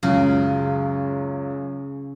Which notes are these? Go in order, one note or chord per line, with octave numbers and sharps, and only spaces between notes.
C#2 F#2 C#3